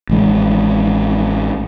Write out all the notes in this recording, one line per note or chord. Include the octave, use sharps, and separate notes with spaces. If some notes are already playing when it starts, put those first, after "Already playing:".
A1 D#3 G#3